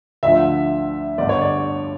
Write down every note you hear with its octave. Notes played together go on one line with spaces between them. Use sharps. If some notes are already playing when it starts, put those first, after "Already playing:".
D2 D3 F3 E5
G1 G2 D3 D5
C#5
D5